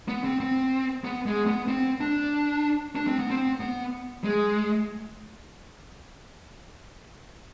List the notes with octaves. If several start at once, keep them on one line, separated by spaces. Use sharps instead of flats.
B3
C4
C4
B3
G#3
B3
C4
D4
D4
C4
B3
C4
B3
G#3